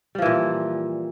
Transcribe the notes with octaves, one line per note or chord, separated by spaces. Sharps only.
A#2 E3 F3 G3